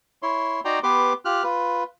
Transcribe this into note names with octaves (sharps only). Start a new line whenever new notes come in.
E4 C#5 C6
D#4 F#4 D5 G5 A#5 C6
B3 G4 B4 C6 D6
F4 G4 F6 F#6
F4 B4